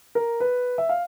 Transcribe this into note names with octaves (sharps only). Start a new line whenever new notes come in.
A#4
B4
E5
F5